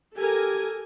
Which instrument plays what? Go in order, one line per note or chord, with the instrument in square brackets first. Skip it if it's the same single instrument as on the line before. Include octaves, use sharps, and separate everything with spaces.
[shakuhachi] G4 [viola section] A4 A#4 G#5